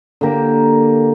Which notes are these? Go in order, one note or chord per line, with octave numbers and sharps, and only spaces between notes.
D3 A#3 G4 A#4